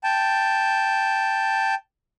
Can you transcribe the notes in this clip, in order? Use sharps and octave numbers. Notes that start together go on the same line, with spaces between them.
G5 A5